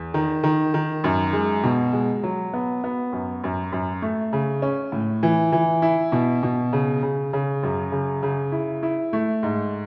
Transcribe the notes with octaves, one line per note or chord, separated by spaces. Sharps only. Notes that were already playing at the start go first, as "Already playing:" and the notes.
Already playing: E2
D#3
D#3
D#3
F#2
G#3
B2
G#3
F#3
B3
B3
F#2
F#2
F#2
A3
C#3
C#4
A2
E3
E3
E4
B2
B2
C#3
C#3
C#3
F#2
C#3
C#3
E4
E4
A3
G#2